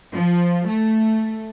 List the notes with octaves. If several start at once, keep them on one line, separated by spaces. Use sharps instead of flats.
F3
A3